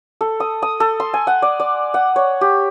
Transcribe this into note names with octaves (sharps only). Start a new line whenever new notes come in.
A4
D#6
D#6
A4
C6
G#5
F#5
D5
D5
F#5
C#5
G4